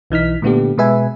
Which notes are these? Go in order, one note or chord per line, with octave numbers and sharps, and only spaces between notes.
B1 E3 D#4 F6 B6
A#2 D3 A3 B3 D4 G4
B2 G#3 B4 E5 G#5